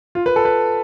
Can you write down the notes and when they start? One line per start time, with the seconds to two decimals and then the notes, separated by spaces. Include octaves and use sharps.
0.15 F4
0.26 B4
0.36 A4
0.45 B4